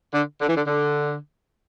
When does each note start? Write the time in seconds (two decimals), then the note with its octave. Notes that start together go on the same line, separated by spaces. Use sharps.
0.14 D3
0.41 D3
0.48 E3
0.57 D3
0.67 D3